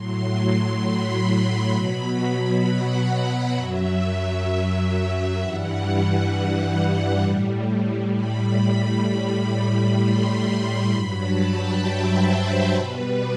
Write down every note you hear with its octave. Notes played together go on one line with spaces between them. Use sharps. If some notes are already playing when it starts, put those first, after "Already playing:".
Already playing: A2 F#3 C6
C6
B5
B2 F#3
F#5
F#5
F#2 F#3 E5
G2 E3 G3 F#5
A2 G3
B5
A2 G3
C6
G2 F#3 B5
A5
G5
E5
C5
C5
B2 G3 B4